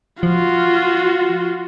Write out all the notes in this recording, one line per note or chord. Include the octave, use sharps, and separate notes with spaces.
F3 F4 F#4